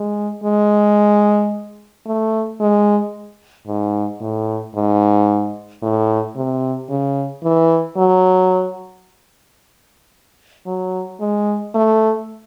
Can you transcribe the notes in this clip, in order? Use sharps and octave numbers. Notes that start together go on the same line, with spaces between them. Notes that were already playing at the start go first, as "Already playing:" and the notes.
Already playing: G#3
G#3
A3
G#3
G#2
A2
G#2
A2
C3
C#3
E3
F#3
F#3
G#3
A3